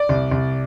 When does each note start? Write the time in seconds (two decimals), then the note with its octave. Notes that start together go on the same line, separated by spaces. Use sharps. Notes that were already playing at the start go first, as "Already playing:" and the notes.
Already playing: D5
0.09 C2
0.31 C2